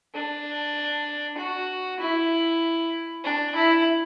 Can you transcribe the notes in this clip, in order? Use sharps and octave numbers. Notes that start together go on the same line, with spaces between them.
D4
F#4
E4
D4
E4